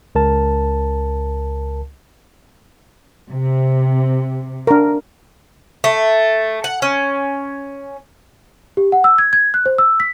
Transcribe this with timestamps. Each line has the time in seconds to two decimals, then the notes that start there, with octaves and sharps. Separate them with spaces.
0.15 C#2 A#4 A5
3.30 C3
4.67 D4 A#4
5.84 A3
6.64 F#5
6.82 C#4
8.77 G4
8.92 F#5
9.04 E6
9.18 G#6
9.33 G#6
9.54 F#6
9.66 C5
9.78 E6
10.00 B6